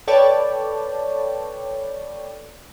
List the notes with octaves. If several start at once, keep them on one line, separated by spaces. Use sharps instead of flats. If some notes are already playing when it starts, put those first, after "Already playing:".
A4 B4 C#5 D5 G5 A5